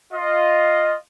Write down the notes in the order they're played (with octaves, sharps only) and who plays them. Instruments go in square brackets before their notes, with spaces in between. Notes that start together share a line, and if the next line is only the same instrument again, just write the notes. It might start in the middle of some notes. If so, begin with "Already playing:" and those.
[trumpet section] F4 D#5